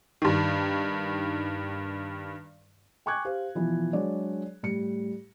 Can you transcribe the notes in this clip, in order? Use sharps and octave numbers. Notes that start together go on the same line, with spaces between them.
G2 D#3
G5 G#5 C#6 D6 F#6 G#6
G4 C5 F5
B2 E3 F3
F#3 G#3 D4 G#4 C#5 D5
A2 G3 C#7